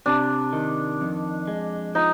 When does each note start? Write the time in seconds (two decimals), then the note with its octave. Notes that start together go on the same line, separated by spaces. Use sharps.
0.06 C3 D4
0.53 D#3
1.01 F2
1.47 G#3
1.95 F3 D#4